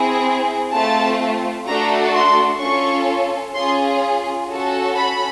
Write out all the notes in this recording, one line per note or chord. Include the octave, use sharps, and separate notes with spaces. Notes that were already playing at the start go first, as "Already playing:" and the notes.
Already playing: C4 E4 G#4
A3 C4 F4 A5
A3 D4 F#4 A4 A#5
C6
C#4 F4 A4 C#6
C#4 F4 G#4 C6
C#4 F#4 A4
B5